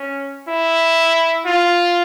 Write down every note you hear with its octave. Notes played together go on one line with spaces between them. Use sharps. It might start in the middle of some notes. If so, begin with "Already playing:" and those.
Already playing: C#4
E4
F4